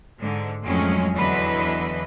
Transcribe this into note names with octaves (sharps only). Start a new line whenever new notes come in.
G#2 D3
F2 A2 F#3 G#3 C#4
E2 D3 E3 F#3 B4 D#5